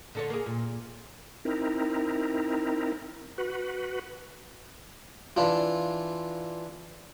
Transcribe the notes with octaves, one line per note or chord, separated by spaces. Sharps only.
D3 A4 C#5
A#3 G#4
A#2
C4 D#4 E4 A#4
F#4 B4
E3 D4 F4